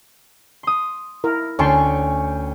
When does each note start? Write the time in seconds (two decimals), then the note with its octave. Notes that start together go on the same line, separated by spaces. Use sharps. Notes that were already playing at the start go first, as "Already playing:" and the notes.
0.63 C6 D#6
1.24 E4 A#4
1.59 D2 C#4 C#5 G5 A5 C6 C#6